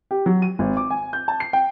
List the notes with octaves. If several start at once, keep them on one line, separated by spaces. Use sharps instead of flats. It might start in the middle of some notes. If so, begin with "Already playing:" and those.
G4
F#3
D#7
G#1
D6
G#5
G6
A5
C7
G5